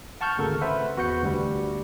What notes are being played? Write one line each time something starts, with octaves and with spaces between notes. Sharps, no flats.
F#5 A5 C#6 F6 G6
G#1 D2 C#3 A4 A#4
B4 C5 E5 F#5
E2 F#4 B4 F#5 G6 C#7
D2 G2 G3